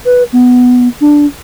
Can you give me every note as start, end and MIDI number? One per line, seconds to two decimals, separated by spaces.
0.05 0.23 71
0.33 0.88 59
1.01 1.26 62